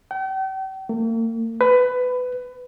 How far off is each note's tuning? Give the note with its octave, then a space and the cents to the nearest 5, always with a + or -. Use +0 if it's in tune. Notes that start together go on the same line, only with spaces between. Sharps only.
G5 -40
A#3 -40
B4 +20